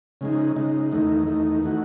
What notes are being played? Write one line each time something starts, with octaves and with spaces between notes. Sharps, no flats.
C#3 G#3 D#4
C#3 G#3 D#4
E2 D#3 A3 D#4
E2 D#3 A3 D#4
E3 A3 D#4 F#4